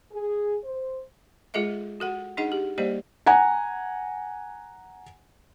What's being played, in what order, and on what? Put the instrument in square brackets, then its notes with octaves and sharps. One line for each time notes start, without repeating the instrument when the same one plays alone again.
[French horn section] G#4
C5
[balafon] G#3 F4 G#4 A4 D#5 E5
F#4 A4 F#5
D4 D#4 G#4 D#5 F#5
G4
G3 A#3 G4 C5 D5 D#5
[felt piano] F#5 G#5 A#5